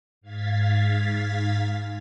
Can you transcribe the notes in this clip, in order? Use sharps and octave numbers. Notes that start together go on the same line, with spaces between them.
G#2 F5 G#6 A6 B6